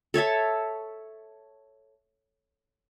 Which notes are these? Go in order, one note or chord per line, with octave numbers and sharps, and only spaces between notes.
A4 C#5 E5 A5